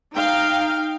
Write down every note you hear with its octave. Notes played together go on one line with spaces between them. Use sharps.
D#4 F5 G5